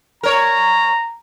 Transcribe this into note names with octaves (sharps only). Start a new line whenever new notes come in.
A#4 C#5 A#5